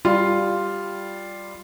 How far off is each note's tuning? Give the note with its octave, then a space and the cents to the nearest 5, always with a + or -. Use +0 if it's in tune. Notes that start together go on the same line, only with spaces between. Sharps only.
G3 +0 F4 +0